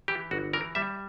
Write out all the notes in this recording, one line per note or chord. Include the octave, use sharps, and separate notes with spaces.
E3 G4
G1 F#4
E3 A#4
G3 E5